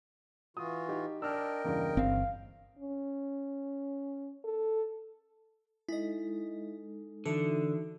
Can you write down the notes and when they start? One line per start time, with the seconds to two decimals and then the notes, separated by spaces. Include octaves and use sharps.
0.57 E3 F4 F#4 D#6
0.89 D#4 G4
1.22 D4 A#4 D#5 G5 E6 F6
1.65 E2 G2 C#3 A#3
1.97 G1 C4 F5
2.79 C#4
4.44 A4
5.89 G#3 D#4 E4 A4 D#5
7.26 D3 E3 D#4 F#4 A4 E5